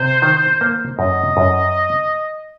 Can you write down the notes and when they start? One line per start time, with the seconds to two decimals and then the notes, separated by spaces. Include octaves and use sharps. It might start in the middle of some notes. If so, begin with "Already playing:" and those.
Already playing: C3 C5
0.22 D#3
0.61 A#3
0.98 F#2 D#5
1.37 F#2